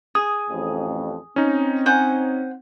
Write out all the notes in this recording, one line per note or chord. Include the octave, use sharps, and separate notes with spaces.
G#4 D#6
A1 F2
C4 C#4 D#4
C5 F#5 G#5